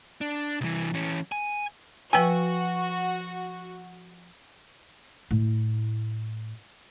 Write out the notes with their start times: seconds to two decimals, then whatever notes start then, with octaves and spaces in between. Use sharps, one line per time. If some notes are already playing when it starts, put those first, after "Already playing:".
0.21 D4
0.61 C2 E3
0.94 E3 C#4
1.32 G#5
2.13 F3 F#4 B4 G5 G#5 E6
5.31 A2 E4